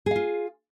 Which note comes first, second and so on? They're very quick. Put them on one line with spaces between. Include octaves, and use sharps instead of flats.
G#4 F5 F4